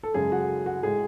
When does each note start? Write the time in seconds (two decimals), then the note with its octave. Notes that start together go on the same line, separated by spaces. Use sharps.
0.03 A4
0.14 F#2 C#3 G#3 G#4
0.32 F#4
0.66 F#4
0.83 A2 G#3 G#4